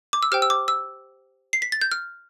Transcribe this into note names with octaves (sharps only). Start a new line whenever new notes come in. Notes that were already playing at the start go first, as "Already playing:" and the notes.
D6
E6
G4 C5 G5 F6
E6
D6
E6
C7
B6
A6
G6
F6